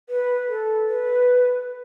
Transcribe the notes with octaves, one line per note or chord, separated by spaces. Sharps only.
B4
A4
B4